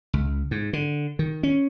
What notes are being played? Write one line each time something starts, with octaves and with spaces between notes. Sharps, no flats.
C#2
G#2
D3
D#3
C#4